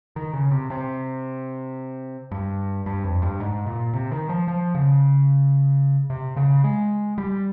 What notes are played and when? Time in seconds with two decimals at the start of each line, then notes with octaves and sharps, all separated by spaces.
0.16 D#3
0.33 C#3
0.51 C3
0.70 C3
2.32 G2
2.86 G2
3.04 F2
3.22 G2
3.40 G#2
3.67 A#2
3.93 C3
4.12 D#3
4.29 F3
4.48 F3
4.75 C#3
6.10 C3
6.36 C#3
6.64 G#3
7.18 G3